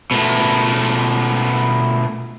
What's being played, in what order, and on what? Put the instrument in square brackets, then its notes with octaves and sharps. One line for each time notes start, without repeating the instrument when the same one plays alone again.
[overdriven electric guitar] B2 A3